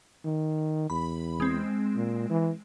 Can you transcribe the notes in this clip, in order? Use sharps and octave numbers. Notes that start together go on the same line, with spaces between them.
D#3
E2 B5
G#3 C4
A#2
E3